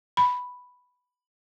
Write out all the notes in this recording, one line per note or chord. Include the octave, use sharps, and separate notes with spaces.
B5